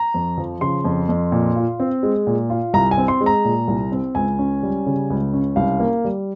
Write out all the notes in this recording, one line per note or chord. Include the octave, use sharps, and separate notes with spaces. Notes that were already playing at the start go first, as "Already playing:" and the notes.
Already playing: A#5
F2
F3
C#3 C6
F2
F2
A#2
F4
C4
G#3
A#2
F4
C2 A#5
G#5
C4
C6
G#3
A#5
A#2
C2
C4
C#2 G#5
C#4
G3
C#3
C#2
C#4
C2 F5
A#3
G3